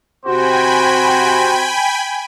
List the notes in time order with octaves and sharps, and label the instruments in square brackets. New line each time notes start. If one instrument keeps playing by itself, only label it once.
[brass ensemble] C3 F#4 [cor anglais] C5 [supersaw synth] G5 G#5 B5